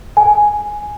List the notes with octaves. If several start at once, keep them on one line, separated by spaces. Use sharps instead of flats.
G#5